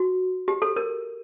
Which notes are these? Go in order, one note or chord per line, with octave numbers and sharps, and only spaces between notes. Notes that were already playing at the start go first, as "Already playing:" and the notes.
Already playing: F#4
G4
A4
A#4